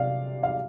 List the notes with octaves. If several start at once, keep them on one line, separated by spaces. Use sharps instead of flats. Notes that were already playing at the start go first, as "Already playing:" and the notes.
Already playing: C3 D5 F5
F5